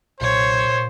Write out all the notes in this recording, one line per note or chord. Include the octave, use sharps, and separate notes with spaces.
B1 A#2 C5 C#5